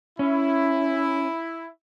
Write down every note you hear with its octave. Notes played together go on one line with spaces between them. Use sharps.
C#4 E4